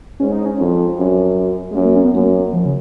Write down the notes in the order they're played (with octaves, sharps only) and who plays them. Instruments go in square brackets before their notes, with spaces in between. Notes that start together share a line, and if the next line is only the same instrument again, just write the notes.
[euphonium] G#2 [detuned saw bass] C#4
[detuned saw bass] D#4
C#4
[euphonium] F2
F#2
[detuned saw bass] G#3
[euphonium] F#2 [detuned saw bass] A#3
[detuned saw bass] A#3
C#4
B3
[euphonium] F#2 [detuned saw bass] A#3
[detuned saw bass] F3
C#3